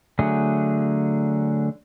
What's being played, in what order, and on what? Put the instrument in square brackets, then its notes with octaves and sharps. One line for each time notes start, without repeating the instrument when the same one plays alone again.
[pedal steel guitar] D3 F#3 A3 G#4